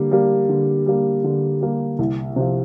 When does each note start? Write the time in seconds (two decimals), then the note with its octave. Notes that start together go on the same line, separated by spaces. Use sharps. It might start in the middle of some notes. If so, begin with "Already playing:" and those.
Already playing: D3 G3 A#3
0.11 G3 A#3
0.49 D3
0.86 G3 A#3
1.24 D3
1.61 G3 A#3
1.99 C2
2.36 C3 F3